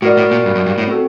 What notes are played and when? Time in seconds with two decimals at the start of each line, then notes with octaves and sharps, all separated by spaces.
0.02 A2 F#4 A#4 D5
0.17 A2
0.31 A#2
0.46 G2
0.55 F#2
0.66 G2
0.78 A2
0.87 C4 F#4 A4